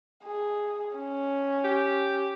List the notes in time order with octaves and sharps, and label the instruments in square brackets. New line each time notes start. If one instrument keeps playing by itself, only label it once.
[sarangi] G#4
C#4
[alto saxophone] G4